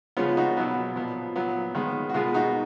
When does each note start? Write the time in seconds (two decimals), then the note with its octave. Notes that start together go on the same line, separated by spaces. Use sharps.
0.17 C#3 F3 G#3 B3 C#4 F4
0.37 D#4 F#4
0.57 B2 F#3 B3
0.96 A#2 F3 B3
1.35 A#2 F#3 B3
1.75 D#3 G#3 B3
2.09 F#4
2.14 B2 G#3 B3 F4 G#4
2.34 D#4 F#4